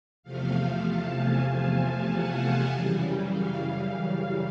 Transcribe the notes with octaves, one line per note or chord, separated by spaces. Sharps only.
E2 C3 F3 A3 F5
A5
G#5
F#5
F#2 C#3 E3 G3
F5
F5